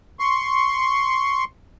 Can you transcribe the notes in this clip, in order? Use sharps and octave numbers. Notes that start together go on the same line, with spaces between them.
C6 C#6